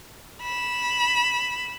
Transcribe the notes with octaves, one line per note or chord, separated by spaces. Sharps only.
B5 E7